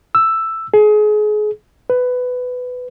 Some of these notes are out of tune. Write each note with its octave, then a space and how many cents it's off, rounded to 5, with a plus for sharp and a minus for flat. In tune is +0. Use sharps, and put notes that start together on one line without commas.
E6 +5
G#4 +30
B4 +15